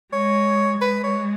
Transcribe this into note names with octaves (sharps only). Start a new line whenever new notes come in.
G#3 C#5
G#3 B4
C#5